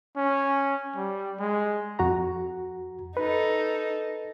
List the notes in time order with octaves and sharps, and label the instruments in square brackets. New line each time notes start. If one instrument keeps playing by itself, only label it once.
[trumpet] C#4
G3
G#3
[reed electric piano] F2 F#4 A#5
[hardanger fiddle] D#4 A4 [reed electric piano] B4